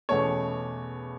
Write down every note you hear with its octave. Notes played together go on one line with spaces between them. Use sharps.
E2 B2 A3 C#4 C#5